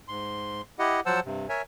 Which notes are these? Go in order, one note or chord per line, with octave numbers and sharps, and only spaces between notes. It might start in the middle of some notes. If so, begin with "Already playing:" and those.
G#2 C6
E4 G4 D#5 F#5
F3 F#3 C5 F#5 A5 E6
G2 C3
A#4 C#5 E5 G#5